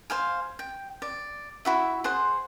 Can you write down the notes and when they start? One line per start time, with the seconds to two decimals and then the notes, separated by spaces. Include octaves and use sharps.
0.10 C5 F5 G#5
0.59 G5
1.02 D5
1.65 E4 F#4 E5
2.04 G#4 C5 F#5 C6